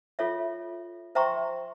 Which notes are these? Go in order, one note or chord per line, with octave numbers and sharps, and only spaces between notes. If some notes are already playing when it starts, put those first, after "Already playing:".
F4 A4 C#5 E5
C5 E5 G5 A#5 C6 C#6